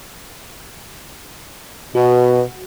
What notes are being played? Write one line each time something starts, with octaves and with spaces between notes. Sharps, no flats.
B2 F#4